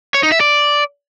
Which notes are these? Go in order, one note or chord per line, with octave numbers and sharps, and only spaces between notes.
C#5
D#4
E5
D5